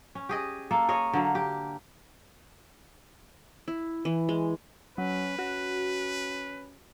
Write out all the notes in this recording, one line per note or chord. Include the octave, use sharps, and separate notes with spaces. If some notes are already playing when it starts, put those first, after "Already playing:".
C#4
G4 G#4 D#5
A#3 A4
G#4 C#5 D#5
D3 F#3 A#3
G4
E4
E3
G#3
F#3 C#4 B4
C#4 F#4